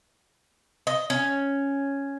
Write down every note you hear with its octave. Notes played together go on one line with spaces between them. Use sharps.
D#5
C#4